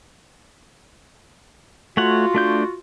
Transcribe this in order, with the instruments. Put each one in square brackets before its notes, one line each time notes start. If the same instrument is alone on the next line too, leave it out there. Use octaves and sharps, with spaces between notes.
[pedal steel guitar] A3 C#5 F#5 [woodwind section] F4 F#4
[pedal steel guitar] A3 D4 G6